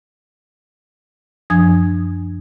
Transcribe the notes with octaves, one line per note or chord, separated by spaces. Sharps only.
F#2 F3 D4 G#5 D#6 G#6